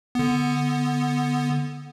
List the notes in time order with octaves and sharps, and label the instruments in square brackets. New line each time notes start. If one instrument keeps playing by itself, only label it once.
[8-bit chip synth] D3 B3